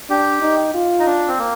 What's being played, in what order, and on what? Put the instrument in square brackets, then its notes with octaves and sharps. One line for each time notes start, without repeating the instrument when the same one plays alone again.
[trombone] D4 [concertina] G4
[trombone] D#4
F4
[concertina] D#4
D4
C4
A#3